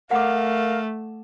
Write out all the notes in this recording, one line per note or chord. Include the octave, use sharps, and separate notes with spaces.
A3 A#4 F5 F#5 D6